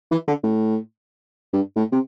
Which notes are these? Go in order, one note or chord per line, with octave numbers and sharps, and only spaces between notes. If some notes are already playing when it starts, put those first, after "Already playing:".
E3
D3
A2
G2
A2
C3